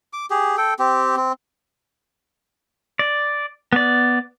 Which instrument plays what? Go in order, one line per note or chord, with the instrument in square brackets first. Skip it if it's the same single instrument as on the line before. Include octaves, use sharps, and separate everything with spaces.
[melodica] D6
G4 G#4
A4 G5
C4 G4
C4
[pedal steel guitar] D5
B3 D5